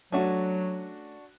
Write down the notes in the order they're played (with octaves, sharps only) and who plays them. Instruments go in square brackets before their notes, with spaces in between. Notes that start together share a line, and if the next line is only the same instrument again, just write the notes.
[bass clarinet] F#3 [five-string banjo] A3 C#4 [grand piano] D4 F#4